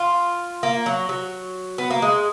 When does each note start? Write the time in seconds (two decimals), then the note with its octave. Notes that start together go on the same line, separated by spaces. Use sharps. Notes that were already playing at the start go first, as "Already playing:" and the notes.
Already playing: F4
0.63 A#3
0.86 F#3
1.09 F#3
1.78 B3
1.91 A#3
2.02 G#3